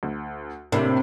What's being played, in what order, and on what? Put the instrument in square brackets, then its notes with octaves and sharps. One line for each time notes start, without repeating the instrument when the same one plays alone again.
[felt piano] D2
[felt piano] A2 A#3 D4 [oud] C3